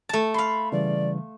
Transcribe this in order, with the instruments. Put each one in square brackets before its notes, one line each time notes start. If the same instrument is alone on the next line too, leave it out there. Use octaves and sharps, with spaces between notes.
[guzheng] A3 A5
[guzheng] F5 C6 [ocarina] B5
[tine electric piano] C#3 E3 G3 [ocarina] D5